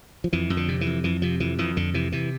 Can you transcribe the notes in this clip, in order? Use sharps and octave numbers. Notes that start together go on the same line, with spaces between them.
F3
F2 E3
F2
D3
C3
E3
F2
F2 E3
C3 F3
F2 E3
F2 E3
F2 D3
C3 E3
C3 E3